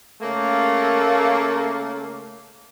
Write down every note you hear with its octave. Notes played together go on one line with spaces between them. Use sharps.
C#3 A3 A#3